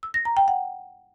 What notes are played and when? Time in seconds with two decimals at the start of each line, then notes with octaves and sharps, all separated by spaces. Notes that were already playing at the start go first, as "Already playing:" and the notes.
0.03 E6
0.14 A#6
0.25 A#5
0.37 G5
0.48 F#5